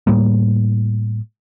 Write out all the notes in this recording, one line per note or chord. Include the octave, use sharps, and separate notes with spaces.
A2 G3 A#3